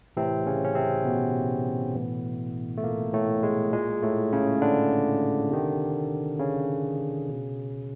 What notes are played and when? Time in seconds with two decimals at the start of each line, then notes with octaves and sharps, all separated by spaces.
0.17 A2 C3 E3 C4
0.46 C#3 C#4
0.65 C#4
0.75 C3 C4
1.05 B2 B3
1.95 A2 E3
2.77 A3
2.83 A#2 A#3
3.13 A2 A3
3.43 G#3
3.73 A#2 G#3
4.03 A2 A3
4.32 C#3 C#4
4.61 D3 D4
5.51 C3 D#3
6.40 C#3 C#4
7.28 B2